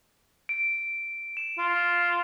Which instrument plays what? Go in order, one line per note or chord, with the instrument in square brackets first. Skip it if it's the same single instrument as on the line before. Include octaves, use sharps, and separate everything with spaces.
[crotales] D7
E7
[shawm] F4